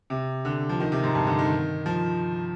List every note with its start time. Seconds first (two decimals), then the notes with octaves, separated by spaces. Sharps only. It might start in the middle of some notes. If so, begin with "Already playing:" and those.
0.10 C3
0.45 D3
0.69 F3
0.80 D#3
0.92 C3
1.03 G#2
1.15 G2
1.27 D3
1.39 D#3
1.86 F3